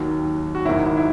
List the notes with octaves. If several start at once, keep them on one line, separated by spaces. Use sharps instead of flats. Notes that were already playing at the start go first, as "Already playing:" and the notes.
Already playing: D#2 D#3 F#3
F#4
G#1 G#2 D#3 F#3 E4
E4
E4